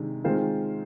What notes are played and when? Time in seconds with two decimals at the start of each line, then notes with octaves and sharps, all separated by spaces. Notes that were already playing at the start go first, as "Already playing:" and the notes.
Already playing: C3 D#3 G#3 D4
0.24 D#3 G#3 C4 F4 C5